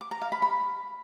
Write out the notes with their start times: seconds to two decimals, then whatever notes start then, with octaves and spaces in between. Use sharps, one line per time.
0.01 D6
0.11 A#5
0.22 F5
0.32 B5
0.42 B5